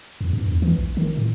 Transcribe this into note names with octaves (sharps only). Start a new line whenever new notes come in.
F2
G2
E2
E3
A#1
D#3
A2